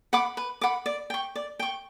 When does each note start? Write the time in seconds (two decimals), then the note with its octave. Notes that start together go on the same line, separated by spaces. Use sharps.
0.13 F#5 B5 D6
0.37 B4
0.61 F#5 B5 D6
0.86 D5
1.10 G5 C#6
1.36 D5
1.59 G5 C#6